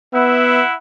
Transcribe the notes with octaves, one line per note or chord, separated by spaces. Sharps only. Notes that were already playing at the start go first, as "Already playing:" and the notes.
B3 E4 E5 F#5